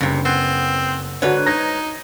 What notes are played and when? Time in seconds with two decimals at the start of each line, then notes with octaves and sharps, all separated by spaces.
0.01 F#1 G2 C3
0.25 B3 C4
1.22 G#2 D3 D4 F#4 B4 C#5
1.46 D#4 G#6 A#6